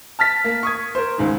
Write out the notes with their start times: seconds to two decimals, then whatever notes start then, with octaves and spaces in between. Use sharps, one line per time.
0.19 A5 F6 A6 B6
0.44 A#3
0.63 C#6 D#6 G#6
0.95 A#4 C5
1.18 C#2 G#2 D#3